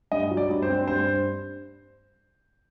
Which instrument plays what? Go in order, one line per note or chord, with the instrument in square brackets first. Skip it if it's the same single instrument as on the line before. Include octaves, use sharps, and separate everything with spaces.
[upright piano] G2 [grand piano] D#5
[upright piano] F#3
[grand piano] D5
[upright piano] G2
[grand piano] C5
[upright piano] C4
[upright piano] G2 [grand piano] C5
[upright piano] G2